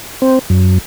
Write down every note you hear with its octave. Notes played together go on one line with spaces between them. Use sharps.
C4
F#2